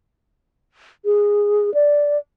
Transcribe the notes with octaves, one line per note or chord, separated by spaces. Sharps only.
G#4
D5